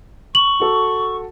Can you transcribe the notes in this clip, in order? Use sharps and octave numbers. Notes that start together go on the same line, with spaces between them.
C#6 F#7
F#4 A4